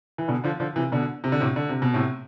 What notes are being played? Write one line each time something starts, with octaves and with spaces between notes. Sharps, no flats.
E3
B2 D3
D3 F3
D3 F3
C3 E3
B2 D3
C3
D3
A2 C3
D3
C3
B2
A2 C3